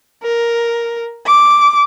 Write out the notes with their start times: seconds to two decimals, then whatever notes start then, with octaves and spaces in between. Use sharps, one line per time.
0.23 A#4
1.27 D6